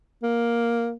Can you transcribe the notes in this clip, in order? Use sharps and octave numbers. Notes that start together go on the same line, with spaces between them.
A#3